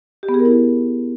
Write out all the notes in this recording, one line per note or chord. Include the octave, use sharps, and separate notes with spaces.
G4
B3
G#4
A#4
E4